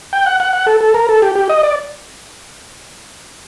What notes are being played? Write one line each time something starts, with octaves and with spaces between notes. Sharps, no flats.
G5
F#5
F#5
F#5
A4
A4
A#4
A4
G4
G4
D#5
D5